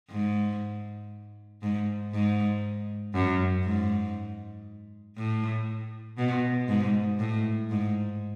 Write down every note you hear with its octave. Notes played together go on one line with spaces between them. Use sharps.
G#2
G#2
G#2
F#2
G#2
A2
B2
G#2
A2
G#2